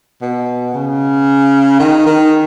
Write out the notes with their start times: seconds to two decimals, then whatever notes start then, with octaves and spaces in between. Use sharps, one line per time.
0.22 B2
0.74 C#3
1.80 D#3
2.06 D#3